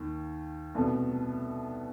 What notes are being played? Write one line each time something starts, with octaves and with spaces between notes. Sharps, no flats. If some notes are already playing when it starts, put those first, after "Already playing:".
Already playing: D#2 D#3
C2 B2 A3